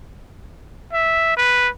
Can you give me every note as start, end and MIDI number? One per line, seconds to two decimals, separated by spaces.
0.93 1.36 76
1.37 1.69 71